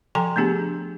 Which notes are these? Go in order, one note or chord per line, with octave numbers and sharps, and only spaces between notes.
F3 A4 G5 G#5 A#5 C6
A3 B3 D4 G4 G#4